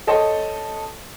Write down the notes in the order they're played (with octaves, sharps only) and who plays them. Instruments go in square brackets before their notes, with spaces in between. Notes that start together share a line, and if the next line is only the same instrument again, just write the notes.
[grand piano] A4 C#5 D#5 G5 A5 C6